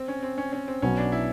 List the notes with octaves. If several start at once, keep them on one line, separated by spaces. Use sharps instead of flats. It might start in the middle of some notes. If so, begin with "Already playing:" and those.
Already playing: C4
C#4
C4
C#4
C#4
C4
B1 B2 F#3 B3 C#4
D4
E4